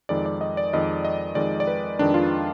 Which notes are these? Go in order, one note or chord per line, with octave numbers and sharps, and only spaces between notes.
F2 D#3 G#3 D5
D5
D#5
D5
F2 D#3 G#3 D#5
D#5
F2 D#3 G#3 D5
D5
B4
F2 D#3 G#3 D4
F4